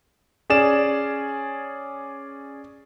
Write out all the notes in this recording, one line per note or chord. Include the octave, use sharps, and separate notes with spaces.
C#4 G#4 D5 E7